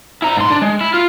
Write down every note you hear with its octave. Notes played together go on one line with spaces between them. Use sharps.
E4 A#5
G#2 C6
D4
G#3
E4
F4